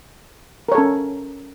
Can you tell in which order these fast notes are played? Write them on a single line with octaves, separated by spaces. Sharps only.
A#4 C#5 A4 C#4